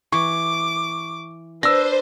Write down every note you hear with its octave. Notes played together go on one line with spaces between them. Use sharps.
E3 C#6 D6
D4 B4 C5 E6 A#6